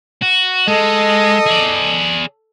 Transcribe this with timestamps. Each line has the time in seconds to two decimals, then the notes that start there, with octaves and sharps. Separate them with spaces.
0.22 F#4
0.68 G#3 A4 D#5
1.46 G#4 D5